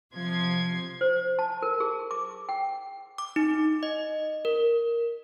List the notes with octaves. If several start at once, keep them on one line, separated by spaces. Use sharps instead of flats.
C3 F3 C6 G#6
C5
A5
A#4
G#4
D6
G5
D6
D#4
D#5
A#4